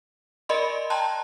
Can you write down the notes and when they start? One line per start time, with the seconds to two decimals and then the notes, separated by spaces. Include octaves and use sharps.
0.49 A#4 D5 D#5 B5 C6
0.90 G5 A5 A#5 C6 F#6